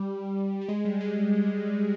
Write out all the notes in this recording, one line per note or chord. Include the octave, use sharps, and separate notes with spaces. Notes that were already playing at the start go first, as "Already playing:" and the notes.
Already playing: G3
G3
G#3
G3
G#3